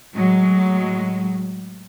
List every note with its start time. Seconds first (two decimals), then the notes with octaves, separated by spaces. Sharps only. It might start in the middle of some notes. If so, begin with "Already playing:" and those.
0.14 A2 F#3 G#3